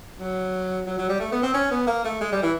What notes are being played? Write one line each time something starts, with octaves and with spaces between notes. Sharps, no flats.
F#3
F#3
F#3
G3
A3
B3
C4
C#4
B3
A#3
A3
G#3
G3
E3